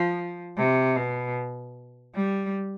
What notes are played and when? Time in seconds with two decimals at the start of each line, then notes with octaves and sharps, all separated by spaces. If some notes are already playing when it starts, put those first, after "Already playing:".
Already playing: F3
0.57 C3
0.96 B2
2.14 G3